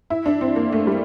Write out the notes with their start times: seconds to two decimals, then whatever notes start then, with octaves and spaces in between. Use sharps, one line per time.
0.10 E4
0.26 D4
0.41 C4
0.56 A#3
0.72 A3
0.87 G3